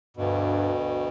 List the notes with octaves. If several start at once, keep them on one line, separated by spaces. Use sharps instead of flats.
D2 G2 B2